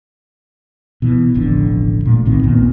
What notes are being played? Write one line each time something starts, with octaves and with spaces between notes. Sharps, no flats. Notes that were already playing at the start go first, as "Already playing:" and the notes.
B2 E3
E1 A1 F2 D3
A#2 A3
B1 A2 D#3 C4
A1 E2 A#2 B3